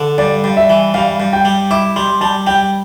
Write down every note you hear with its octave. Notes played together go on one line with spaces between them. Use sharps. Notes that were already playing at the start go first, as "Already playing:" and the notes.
Already playing: D3
G2 D5
G2
E5
E3
G2 F5
G2
G5
G3
E4 D6
G3 C6
G3 A5
G3 G5